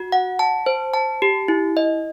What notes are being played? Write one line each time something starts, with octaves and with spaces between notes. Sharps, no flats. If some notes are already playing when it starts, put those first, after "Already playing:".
Already playing: F#4
F#5
A5
C5
A5
G4
E4
D#5